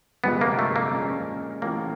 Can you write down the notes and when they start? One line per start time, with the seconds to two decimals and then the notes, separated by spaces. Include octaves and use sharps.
0.24 G1 F2 C3 F3 G#3 B3
0.41 A#3
0.59 A3
0.76 A#3
0.92 A#2 F3 G#3 C#4
1.62 A1 A2 F3 A#3